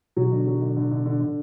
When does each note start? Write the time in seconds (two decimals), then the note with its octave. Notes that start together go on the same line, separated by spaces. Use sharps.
0.17 B2 F#3
0.32 D3
0.47 F#3
0.62 D3
0.77 D3
0.91 D3
1.06 D3
1.20 D3